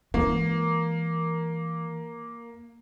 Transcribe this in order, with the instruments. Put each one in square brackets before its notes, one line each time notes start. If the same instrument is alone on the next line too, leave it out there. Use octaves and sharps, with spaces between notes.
[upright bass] E3 G#3 [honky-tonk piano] A#3